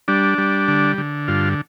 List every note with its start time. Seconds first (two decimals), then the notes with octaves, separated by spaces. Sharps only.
0.08 G3 D4
0.38 G3
0.68 D3
0.98 D3
1.28 G2 F4